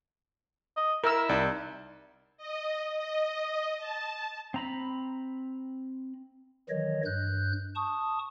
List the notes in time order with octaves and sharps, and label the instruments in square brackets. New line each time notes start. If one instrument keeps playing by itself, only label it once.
[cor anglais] D#5
[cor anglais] E4 [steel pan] A#4 E6
[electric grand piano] C2 D#4 D5
[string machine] D#5
D#5
A5
[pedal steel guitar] C4 A#5 B5
[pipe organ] D#3 E3 F#3 C#5 D#5
G2 F#6 G6
A5 C#6 D#6